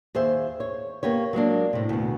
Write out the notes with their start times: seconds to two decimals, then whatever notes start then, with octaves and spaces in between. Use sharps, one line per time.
0.15 D#2 G#4 C5 E5
0.60 C#5
1.03 A#3 B3 G4 C#5
1.33 F#3 G#3 A#3 D4
1.73 A2 C3
1.89 D2 B2